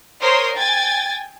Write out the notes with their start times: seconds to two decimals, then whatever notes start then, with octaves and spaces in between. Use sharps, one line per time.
0.21 A#4 C5 C#5 C6 D#6 C7
0.55 G5 G#5 G#6 A6